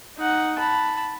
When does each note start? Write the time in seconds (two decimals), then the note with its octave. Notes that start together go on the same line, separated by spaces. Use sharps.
0.18 D#4 F#5
0.59 A5 B5